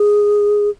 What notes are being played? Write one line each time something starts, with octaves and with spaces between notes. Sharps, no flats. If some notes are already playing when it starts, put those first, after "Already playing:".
Already playing: G#4